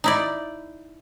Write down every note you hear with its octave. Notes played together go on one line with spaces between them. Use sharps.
D#4 E4 D5